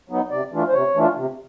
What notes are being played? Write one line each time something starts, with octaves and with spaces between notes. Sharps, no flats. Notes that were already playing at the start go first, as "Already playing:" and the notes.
F#3 B3 D#4
C3 D5
E3 A3 D4 F4
C5
C3 C#5
E3 A3 D4 F4
C3